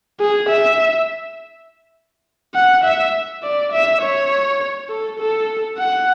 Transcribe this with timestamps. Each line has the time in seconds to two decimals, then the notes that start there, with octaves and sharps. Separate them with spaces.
0.20 G#4
0.49 E5
2.55 F#5
2.84 E5
3.43 D5
3.72 E5
4.02 C#5
4.89 A4
5.19 A4
5.78 F#5